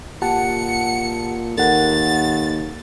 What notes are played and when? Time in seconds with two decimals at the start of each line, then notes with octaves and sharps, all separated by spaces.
0.22 A#2 G4 F#5 A5 C#7
1.58 D#2 A4 A#4 F#5 A6